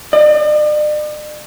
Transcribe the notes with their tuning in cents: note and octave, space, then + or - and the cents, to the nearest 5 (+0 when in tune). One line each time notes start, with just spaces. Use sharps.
D5 +45